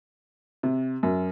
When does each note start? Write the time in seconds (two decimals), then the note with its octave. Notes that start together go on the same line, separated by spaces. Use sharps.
0.63 C3
1.03 F#2